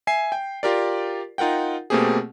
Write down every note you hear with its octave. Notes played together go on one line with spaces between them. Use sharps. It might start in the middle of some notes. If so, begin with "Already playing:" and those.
E5 G#5 C7
G5
F4 G4 A#4 D5
D#4 F4 A#4 F#5 G5
B2 A3 A#3 C4 G4 G#4